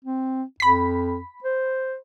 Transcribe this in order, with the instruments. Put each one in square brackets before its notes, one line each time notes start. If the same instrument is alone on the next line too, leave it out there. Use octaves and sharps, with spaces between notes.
[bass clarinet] C4
[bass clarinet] F2 [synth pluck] B5 B6
[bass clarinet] C5